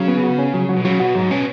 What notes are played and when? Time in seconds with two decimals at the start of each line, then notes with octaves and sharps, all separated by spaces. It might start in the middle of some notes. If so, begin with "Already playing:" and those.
Already playing: C#3 F#3
0.08 B3
0.23 F#4
0.38 C#4
0.54 F#3
0.69 F#3
0.76 B2
0.85 C#3 F#3
1.00 B2 F#4
1.15 G#2 F#3
1.31 B2 C#4